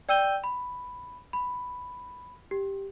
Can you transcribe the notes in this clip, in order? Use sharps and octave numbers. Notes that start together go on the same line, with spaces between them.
D5 G5 E6 G6 D#7 G7
B5
B5
G4